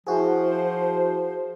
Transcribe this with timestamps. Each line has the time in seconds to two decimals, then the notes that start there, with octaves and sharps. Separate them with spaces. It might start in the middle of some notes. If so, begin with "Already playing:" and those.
0.07 F3 E4 F#4 G#4 C5